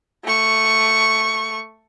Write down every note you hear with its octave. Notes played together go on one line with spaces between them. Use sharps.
A3 C#6